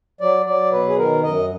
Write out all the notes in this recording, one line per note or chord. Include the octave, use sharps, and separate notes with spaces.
F#3 D5
F#3 D5
B2 B4
G#4
D#3 A#4
F#2 D#5